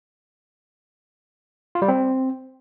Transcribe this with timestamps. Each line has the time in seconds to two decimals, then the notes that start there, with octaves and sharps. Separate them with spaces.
1.75 F4
1.82 G3
1.88 C4